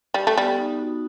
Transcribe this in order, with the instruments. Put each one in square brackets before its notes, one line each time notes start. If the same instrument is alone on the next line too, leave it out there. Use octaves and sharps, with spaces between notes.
[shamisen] G3
A3
[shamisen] G3 [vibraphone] B3
[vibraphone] D#4
D#4 F#4